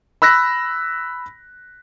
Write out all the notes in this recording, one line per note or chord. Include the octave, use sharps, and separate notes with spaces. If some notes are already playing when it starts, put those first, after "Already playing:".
B5 E6 F#6 A#6 B6